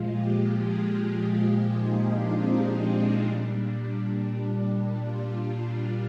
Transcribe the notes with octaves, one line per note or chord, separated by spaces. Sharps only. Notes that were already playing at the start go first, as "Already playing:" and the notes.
Already playing: A#2 F3 G#3 F4
G4
G#4
G4
D#4
D4
C4
D4
A#2 G3 D4
F4
D4